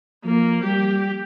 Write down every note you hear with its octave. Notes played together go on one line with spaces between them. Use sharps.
F3 A#3
G3 G4